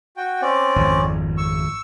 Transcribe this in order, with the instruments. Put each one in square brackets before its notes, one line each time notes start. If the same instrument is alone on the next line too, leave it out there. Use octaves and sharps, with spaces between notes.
[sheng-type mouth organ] F#4 G5
C4 C#4 D5
[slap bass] G#1 F2
[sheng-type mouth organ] C#6 E6